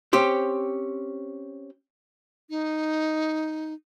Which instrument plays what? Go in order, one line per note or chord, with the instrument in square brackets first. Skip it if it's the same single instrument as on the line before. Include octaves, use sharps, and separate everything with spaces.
[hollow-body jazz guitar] C4 C#4 G4 C5
[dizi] D#4